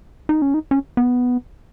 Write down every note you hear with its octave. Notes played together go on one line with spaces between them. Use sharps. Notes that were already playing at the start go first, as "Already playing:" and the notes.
D#4
C#4
D#4
C#4
B3